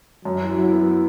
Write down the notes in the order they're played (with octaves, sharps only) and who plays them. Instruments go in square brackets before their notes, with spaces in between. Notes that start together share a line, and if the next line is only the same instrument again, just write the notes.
[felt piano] F#2 [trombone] F#3
[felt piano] E3
[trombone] F#3 [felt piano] E4
[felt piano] B3